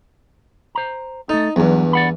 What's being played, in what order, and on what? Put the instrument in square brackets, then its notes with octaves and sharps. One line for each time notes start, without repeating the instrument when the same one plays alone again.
[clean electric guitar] C5 A#5
[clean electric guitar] A3 A4 [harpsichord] D#4
[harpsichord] E2 G2 [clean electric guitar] F#3
[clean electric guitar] D5 F#5 B5